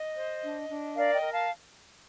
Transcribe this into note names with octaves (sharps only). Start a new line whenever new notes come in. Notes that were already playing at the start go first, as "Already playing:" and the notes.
Already playing: D#5
C5
D4
D4
A#4 D5 F5
D#5 G5
A#4
F5 A5